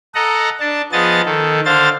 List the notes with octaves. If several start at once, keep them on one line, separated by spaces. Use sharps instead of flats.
A4 D#5 F#5 A#5
D4 A5
F3 B3 G#4 D#5 A6
D#3 A4
D3 C5 F5 A6